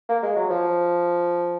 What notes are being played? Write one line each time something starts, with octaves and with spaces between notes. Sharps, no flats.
A#3
G#3
F#3
F3